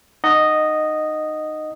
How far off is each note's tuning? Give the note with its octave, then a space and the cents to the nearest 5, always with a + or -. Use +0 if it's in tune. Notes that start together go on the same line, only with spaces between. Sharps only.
D#4 -20 D#5 -5 F#5 +0